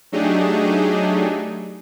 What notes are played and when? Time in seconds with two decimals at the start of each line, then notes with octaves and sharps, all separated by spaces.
0.12 F#3 A3 D4 D#4 G4 G#4